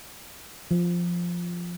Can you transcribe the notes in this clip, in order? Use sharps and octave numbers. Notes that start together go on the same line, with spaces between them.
F3